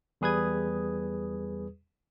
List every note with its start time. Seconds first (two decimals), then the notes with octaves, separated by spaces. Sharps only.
0.21 E2 G3 G#4 B4 D#6 G#6